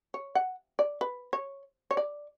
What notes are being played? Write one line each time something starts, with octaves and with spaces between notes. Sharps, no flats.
C#5
F#5
D5
B4
C#5
C#5
D5